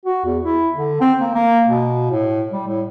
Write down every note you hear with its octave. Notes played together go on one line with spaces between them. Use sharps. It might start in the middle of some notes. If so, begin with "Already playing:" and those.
F#4
E2
E4
D3
C4
A#3
A#3
B2
A2
G3
A2